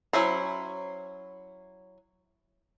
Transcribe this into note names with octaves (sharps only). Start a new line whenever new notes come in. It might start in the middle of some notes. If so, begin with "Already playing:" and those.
F#3 C#4 E4 C5